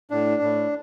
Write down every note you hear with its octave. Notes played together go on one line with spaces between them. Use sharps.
A2 D4
A2